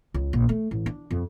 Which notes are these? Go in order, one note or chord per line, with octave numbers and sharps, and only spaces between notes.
C#2
A#1
A3
A1
D4
F2